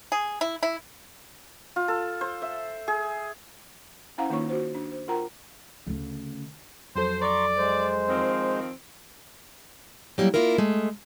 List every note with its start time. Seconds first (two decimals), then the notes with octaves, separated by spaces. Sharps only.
0.12 G#4
0.41 E4
0.63 E4
1.76 F4
1.88 A4
2.21 C5
2.42 E5
2.88 G#4
4.18 C#4 E4 C5 F5 F#5 A#5
4.30 D#3 A#3 D#4 F4 C#5 C#6
4.49 F#4 C5
4.75 D4
4.92 C5
5.08 F4 A#4 F#5 G5 A#5
5.87 D2 C#3
6.95 F2 F#3 A4 C5
7.22 D5 A#5 C6 C#6
7.57 G#3 C5
8.08 D#3 F3 C4
10.18 F#3 G3 A#3 E4
10.34 A#3 D4 E4 F4 A#4
10.58 G#3 A3